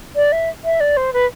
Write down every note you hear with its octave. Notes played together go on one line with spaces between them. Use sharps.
D5
E5
E5
D5
C5
B4